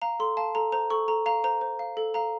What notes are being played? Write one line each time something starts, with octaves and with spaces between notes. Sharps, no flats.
F5 A#5
A4 C6
F5 A5
A4 A#5
C5 A#5
A4 C#6
A4 A#5
F5 A#5
C5 A#5
C5
F5
A4
F5 A#5